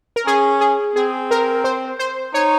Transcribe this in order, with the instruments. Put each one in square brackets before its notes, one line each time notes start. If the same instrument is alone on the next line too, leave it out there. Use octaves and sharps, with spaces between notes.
[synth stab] A#4
[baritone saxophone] C#4 [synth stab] G#4
[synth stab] G#4
[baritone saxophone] C4 [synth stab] G#4
[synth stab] A#4
C5
C5
[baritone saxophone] D#4 [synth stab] C#5